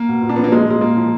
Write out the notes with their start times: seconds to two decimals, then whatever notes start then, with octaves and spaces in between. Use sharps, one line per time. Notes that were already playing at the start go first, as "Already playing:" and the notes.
Already playing: A#3
0.08 B2
0.22 A#2
0.29 D4
0.36 F3 B3
0.44 A#3
0.52 A#2 G#3
0.67 A#2 G#3
0.81 A#2 A#3
0.97 F3